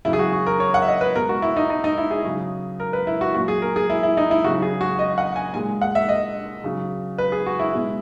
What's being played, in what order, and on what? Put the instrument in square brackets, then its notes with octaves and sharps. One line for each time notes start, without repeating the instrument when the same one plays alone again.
[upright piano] C#3 F#3 E4
G#4
F#4
F#4
A#4
C#5
F#5
E5
D#5
B4
B2 G#3 A#4
F#4
E4
D#4
D#4
D#4
E4
G#4
C#3 F#3
A#4
B4
E4
F#4
A#2 F#3 F#4
G#4
A#4
G#4
E4
E4
D#4
E4
C#3 F#4
F#3
G#4
F#4
D#5
F#5
G#5
A#2 G#3 G#5
F#5
E5
D#5
C#3 F#3
B4
G#4
F#4
E4
B2 G#3